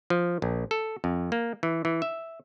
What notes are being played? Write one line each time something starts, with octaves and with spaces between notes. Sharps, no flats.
F3
A#1
A4
F2
A#3
E3
E3
E5